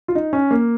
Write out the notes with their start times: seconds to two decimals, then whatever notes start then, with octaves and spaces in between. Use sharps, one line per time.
0.08 F4
0.15 D#4
0.33 C#4
0.51 A#3